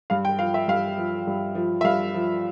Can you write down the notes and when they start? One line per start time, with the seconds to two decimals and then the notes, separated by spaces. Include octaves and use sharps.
0.10 G2 F5
0.25 G5
0.39 F3 F5
0.54 E5
0.68 G2 F5
0.98 F3
1.27 G2
1.55 F3
1.81 E5
1.84 G2 F5
2.14 F3